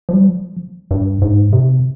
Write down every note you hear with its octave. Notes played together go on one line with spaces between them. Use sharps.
F3
G3
F3
G2
G#2
C3